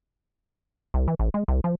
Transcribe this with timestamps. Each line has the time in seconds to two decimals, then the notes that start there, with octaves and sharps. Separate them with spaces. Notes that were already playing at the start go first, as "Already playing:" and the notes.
0.94 C2
1.08 E3
1.19 A1
1.34 G#3
1.48 C2
1.64 F3